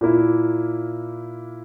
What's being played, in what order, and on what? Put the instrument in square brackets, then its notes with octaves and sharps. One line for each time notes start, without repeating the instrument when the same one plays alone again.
[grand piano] A#2 A#3 E4